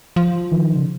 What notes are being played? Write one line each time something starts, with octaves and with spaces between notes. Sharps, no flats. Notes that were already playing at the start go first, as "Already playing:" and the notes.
F3
D#3
C#3